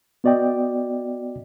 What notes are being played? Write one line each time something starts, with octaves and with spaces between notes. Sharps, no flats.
B3 F#4 D5 D#5 G5